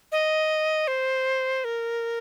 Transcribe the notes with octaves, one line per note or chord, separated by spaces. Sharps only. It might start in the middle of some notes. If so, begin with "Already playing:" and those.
D#5
C5
A#4